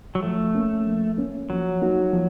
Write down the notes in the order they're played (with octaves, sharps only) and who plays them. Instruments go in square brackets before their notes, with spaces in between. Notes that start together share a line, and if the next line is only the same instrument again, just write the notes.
[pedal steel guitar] F#3
[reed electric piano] F3 [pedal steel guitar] A3
[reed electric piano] A#3 C#4
F3
A#3 C#4
[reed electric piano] F3 [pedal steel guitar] F#3
[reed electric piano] A#3 D#4 F#4
F3